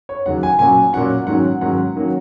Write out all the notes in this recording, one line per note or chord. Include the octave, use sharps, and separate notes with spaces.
C#5
D#2 C#3 F#3 F#5
G#5
A#2 F#3 C#4 G#5
A#2 F#3 C#4 F#5
G#2 D#3 F#3 C#4 F#5
G#2 D#3 F#3 C#4 F#5
D#3 F#3 A#3 C#4